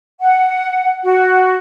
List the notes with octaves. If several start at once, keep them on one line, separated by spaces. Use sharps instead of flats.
F#5
F#4